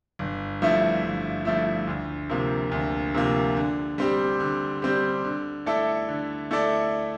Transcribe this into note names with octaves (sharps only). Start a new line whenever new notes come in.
G1
G2 F3 A3 E4
G1
G2 F3 A3 E4
D2
C3 F3 A#3
D2
C3 F3 A#3
D3
G3 C4 G4
D3
G3 C4 G4
D3
A3 E4 A4 D5
D3
A3 E4 A4 D5